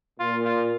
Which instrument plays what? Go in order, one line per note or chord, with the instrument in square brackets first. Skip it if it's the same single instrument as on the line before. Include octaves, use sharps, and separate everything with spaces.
[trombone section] A#2 [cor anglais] F4
[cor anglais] F4